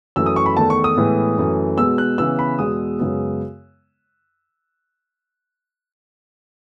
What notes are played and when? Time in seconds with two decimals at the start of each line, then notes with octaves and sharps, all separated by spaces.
0.16 F#2 E3 A3 E6
0.26 D#6
0.36 C#6
0.46 B5
0.56 E2 D#3 A3 A5
0.70 C#6
0.84 D#6
0.97 A2 E3 G#3 B3
1.38 F#2 E3 A3
1.78 B2 G#3 B3 E6
1.98 F#6
2.18 C#3 E3 B3 E6
2.39 B5
2.59 E2 B2 G#3 B3 D#6
2.99 F#2 C#3 G#3 B3